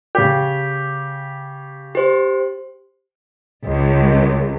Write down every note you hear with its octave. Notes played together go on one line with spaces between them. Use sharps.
C#3 G4
G4 C5
C#2